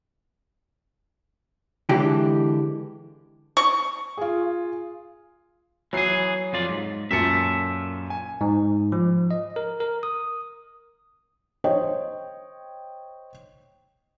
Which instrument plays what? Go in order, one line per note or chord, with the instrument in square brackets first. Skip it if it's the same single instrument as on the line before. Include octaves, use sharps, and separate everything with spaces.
[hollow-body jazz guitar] D3 E3 G#3 D4 G4
[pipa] C#6
[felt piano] F4 G#4
[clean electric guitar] E3 G#4 [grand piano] F#3 C7
[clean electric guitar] F2 F4 D5
G#2
[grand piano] F#2 A#2 C#7 [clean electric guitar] A4 E5
[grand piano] G#5
[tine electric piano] G#2
F3
D#5
A#4
A#4
D#6
[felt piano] C5 C#5 D#5 G5